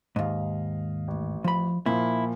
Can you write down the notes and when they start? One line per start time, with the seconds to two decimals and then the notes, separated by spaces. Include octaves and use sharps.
0.16 D#2 G#2 D#5 F5
1.08 A1
1.44 F3 B5
1.86 A#2 F3 E4